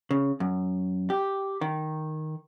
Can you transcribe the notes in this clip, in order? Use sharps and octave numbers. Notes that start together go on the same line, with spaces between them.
C#3
F#2
G4
D#3